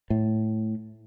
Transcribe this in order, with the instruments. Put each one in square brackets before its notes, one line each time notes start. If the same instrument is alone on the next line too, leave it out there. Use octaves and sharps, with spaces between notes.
[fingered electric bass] A2